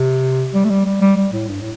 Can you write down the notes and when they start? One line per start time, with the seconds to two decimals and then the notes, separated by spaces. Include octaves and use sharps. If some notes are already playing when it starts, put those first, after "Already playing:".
Already playing: C3
0.54 G3
0.65 A3
0.70 G3
0.86 G3
1.01 G3
1.17 G3
1.33 A2
1.49 G2
1.61 A2